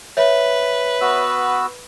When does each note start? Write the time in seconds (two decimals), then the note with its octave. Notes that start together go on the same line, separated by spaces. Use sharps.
0.17 B4 C#5 E5
1.01 B3 F#4 E6